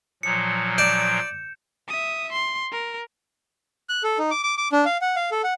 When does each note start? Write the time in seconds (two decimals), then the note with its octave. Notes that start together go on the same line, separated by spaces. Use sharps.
0.23 A#2 F3 F#3 C#7
0.78 D5 G6 E7
1.88 E5 D#6
2.32 C6
2.72 A#4
3.89 F#6
4.04 A4
4.19 D#4
4.31 D6
4.43 D6
4.58 D6
4.72 D4
4.85 F5
5.01 F#5
5.16 F5
5.31 A4
5.44 F#5